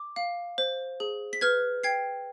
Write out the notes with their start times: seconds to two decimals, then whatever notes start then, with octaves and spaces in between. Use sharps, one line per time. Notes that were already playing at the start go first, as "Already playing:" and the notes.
Already playing: D6
0.16 F5
0.58 C5
1.00 G#4
1.33 B6
1.41 B4 F6 G#6
1.83 G5 G#6 C7